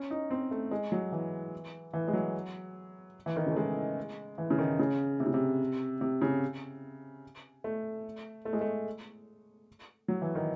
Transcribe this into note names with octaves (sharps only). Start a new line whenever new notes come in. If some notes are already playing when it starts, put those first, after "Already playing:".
Already playing: C#4
D#4
C4
A3
G#3
F#3
E3
E3
G#3
F#3
E3
D#3
C#3
A3
G#3
E3
C#3
D#3
C#3
C3
C#3
C3
C3
C#3
A3
A3
G#3
A3
F#3
E3
D#3